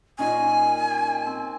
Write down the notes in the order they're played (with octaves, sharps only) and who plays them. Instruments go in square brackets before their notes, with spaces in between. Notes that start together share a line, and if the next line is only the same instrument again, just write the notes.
[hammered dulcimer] A#2 D#3 C#4 [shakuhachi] G#5
[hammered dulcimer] C4